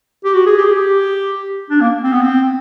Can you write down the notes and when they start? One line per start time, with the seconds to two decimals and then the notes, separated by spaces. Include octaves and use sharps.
0.24 G4
0.34 F#4
0.46 G#4
0.58 G4
0.66 G#4
0.73 G4
1.70 D4
1.81 A#3
2.04 C4
2.12 B3
2.21 C4